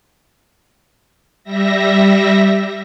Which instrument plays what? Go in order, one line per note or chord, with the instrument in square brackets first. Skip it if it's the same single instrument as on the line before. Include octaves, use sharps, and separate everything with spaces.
[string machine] G3 E5 A#6